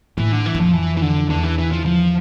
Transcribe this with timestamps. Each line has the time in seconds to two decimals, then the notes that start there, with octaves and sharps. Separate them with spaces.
0.18 A2 E3
0.32 D3
0.46 E3
0.55 F2
0.60 F3
0.74 E3
0.97 E3
1.02 D3
1.30 E2 D3
1.43 E3
1.58 E3
1.71 F3
1.85 F3